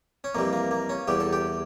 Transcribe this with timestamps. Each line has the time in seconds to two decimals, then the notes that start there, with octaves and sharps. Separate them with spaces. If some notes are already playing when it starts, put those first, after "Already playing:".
0.24 C#4
0.35 F2 E3 G3 A#3
0.53 A#3
0.71 A#3
0.89 C#4
1.08 E2 E3 G3 G4
1.20 A4
1.33 G4